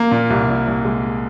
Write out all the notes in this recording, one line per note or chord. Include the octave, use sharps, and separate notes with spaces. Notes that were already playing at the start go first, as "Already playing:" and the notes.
Already playing: A#3
A#2
C2
A#2
C2
G#3